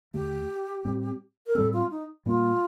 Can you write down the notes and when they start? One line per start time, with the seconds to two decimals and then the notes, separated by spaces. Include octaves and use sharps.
0.14 D#2 D3 A3 G4
0.85 A2 G3 C4
1.46 A#4
1.55 A2 G3 C4 A4
1.73 F4
1.91 D#4
2.26 A#2 G3 A#3 F4